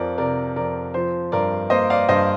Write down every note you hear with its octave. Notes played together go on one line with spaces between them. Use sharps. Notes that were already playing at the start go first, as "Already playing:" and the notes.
Already playing: F2 F3 A#4 D5
C3 A#4 D5
F2 A#4 D5
F3 C5
G2 A#4 D5
A#3 C5 D#5
D5 F5
G2 C5 D#5